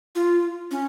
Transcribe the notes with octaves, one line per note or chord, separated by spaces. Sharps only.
F4
C#4